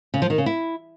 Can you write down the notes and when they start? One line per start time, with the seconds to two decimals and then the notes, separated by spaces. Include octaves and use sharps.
0.14 C#3
0.22 F3
0.30 D#3
0.38 C#3
0.46 E4